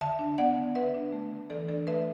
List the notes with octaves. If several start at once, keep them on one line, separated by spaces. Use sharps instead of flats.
D3 E5 A5
D4
B3 D5 F#5
D3
D3 B4 E5
D4
A3
D3
E3 A4 D5
D4 A4 D5
A3 B4 E5